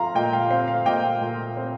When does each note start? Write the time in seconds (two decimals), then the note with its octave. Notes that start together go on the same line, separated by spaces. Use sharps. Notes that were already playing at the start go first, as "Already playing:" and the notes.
Already playing: F3 C4 F5 A#5 C6
0.15 A#2 D#5 G5
0.33 F5
0.50 C4 F5
0.68 F5
0.86 A#2 D#5 G5
1.21 A#2
1.57 C4